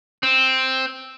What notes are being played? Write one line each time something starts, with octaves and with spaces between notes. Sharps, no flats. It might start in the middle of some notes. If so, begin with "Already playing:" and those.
C4